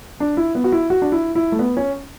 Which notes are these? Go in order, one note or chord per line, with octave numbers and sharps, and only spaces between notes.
D4
E4
B3
F#4
E4
F#4
D4
E4
E4
A3
B3
C#4